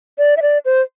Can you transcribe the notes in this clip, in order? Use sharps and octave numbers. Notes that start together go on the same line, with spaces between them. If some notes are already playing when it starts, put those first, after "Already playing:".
D5
E5
D5
C5